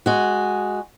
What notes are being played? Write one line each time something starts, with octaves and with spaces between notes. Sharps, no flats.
G#3 F#4